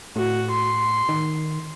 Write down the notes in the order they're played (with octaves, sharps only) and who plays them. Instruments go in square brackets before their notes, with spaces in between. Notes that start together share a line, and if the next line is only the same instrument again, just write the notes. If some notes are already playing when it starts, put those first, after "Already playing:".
[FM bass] A2 [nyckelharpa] F#4
[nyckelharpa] C6
[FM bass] D#3